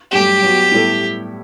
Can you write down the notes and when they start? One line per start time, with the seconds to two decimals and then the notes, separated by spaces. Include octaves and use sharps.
0.12 G2 F#3 A3 G4
0.42 F#3 B3 F#4
0.72 A2 G3 B3 E4 A4